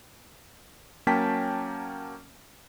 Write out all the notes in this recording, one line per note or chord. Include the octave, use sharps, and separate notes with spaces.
F#3 A#3 C#4 G5 A5 B6